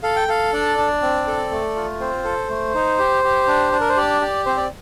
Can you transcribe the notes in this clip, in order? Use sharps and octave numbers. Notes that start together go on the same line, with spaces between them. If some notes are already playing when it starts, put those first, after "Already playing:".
A4 F5
G5
A4 F5
D4 D5
D4
C4
A4
A3
F4
C4 C5
A4
A3
D#4
G4
G4
D4
D4
A#4
C5
G4 D5
G4
C4 C5
D5